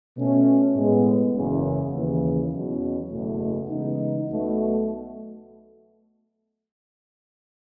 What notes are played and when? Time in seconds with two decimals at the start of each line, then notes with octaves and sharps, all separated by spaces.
0.16 B2 A3 C#4
0.75 A2 G#3 B3
1.35 F#1 E2 C#3
1.93 D#2 C#3 E3
2.52 E2 B2 F#3 C#4
3.11 F#1 E2 B2 A3
3.70 C#3 E3 G#3 B3 D#4
4.29 B1 B2 A3